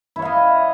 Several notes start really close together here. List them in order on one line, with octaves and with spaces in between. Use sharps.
E4 C#5 F5 D#5